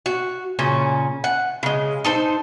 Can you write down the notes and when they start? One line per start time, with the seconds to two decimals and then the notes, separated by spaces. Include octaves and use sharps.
0.06 F#4
0.59 A#2 C#3 C#4
1.24 F#5
1.63 C#3 G#3
2.05 D#4 A4 C5